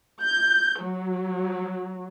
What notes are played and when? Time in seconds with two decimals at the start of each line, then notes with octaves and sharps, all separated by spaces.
0.23 G6
0.83 F#3